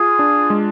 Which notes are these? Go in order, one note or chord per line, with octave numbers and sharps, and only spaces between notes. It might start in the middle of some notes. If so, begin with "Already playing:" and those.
Already playing: F4 G#4
D4
G#3